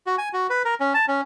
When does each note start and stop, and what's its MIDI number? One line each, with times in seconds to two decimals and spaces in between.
0.07 0.16 66
0.18 0.29 80
0.33 0.47 66
0.50 0.63 71
0.65 0.75 70
0.80 0.93 61
0.94 1.05 81
1.08 1.21 61